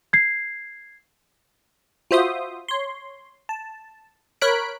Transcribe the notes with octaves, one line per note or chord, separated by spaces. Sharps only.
G#6 C7
F4 F#4 C5 E5 C6 D#6
C#5 C6
A5
A#4 C#5 B5 F#6 B6 D7